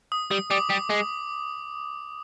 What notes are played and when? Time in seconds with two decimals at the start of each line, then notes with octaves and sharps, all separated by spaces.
0.12 D#6
0.31 G3 D#6
0.51 G3 D6
0.70 G3 D#6
0.90 G#3 D6